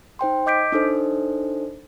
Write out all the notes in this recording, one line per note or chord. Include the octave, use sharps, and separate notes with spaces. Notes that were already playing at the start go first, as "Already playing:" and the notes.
D#4 C5 G5 C6
D#5 D6 G6 B6 D7
D4 D#4 A4 C5